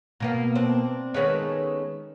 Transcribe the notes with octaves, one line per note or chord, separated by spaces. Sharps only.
B2 A#3 B3 F5 G5 A#5
C4 D4
D#3 G#3 A3 B3 C#4 B4